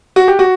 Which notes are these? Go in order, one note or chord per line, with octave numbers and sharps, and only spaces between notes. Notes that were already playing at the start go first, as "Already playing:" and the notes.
F#4
G4
F#4